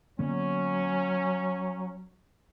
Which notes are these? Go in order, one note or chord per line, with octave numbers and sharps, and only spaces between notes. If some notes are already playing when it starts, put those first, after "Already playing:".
D3 F#3 A#3 B3 C#4